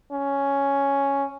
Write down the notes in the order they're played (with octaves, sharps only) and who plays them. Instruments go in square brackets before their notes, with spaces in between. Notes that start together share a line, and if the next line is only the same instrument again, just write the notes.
[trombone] C#4